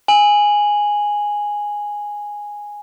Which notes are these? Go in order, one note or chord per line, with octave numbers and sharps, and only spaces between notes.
G#5 F#7